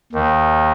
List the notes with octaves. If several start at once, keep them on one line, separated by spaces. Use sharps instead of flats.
D#2 D#3